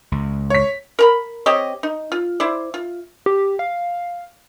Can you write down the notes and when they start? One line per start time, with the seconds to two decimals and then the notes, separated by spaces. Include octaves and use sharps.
0.12 C#2
0.50 C#5 B6
0.99 A#4 A#5 B5
1.46 C4 G4 C#5 D#5
1.83 D#4
2.12 F4
2.40 E4 C5 D5
2.74 F4
3.26 G4
3.59 F5